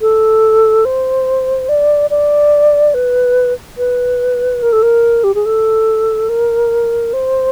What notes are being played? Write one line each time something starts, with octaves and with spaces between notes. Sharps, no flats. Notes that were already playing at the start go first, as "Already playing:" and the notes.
A4
C5
D5
D5
B4
B4
A#4
A4
A#4
G4
G#4
A4
A#4
C5